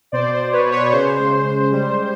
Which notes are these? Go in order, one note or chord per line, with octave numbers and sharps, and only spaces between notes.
B2 C5 D5
C5
B2
B4 C#5
B2
B4 C#5
C#3 C5
G#3
G#3
G3
G3